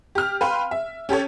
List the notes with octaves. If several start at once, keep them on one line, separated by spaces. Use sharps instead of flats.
G4 F6
B4 F5 G5 C6
E5
C#4 G4 A4 C#5